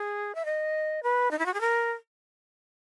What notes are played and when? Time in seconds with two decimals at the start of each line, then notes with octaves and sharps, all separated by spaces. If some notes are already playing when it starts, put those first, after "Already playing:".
Already playing: G#4
0.35 E5
0.45 D#5
1.03 B4
1.31 D#4
1.39 E4
1.46 F#4
1.54 G#4
1.61 A#4